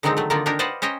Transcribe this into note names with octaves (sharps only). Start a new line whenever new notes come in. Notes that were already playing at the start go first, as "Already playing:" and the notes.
D3 D#3 F#3 G#3 C4 D#4
F#3 A3
D3 D#3 A#3 D#4 F4 D5
A#3 D4 D#4 G4 A#4
B4 C5 D5 D#5 F5 F#5
C#4 C5 D#5 G5 A#5